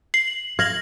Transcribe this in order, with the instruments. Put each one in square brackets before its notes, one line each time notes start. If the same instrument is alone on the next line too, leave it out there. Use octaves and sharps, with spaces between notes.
[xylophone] C7 [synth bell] F#7
[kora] F5 [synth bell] G#6 A#6 F#7